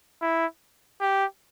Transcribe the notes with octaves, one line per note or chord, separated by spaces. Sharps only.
E4
G4